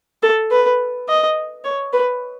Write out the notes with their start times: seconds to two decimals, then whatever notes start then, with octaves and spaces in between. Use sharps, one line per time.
0.23 A4
0.51 B4
1.08 D#5
1.64 C#5
1.93 B4